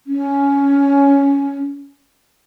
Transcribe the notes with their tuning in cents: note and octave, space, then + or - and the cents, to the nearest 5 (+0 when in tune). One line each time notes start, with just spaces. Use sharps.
C#4 +10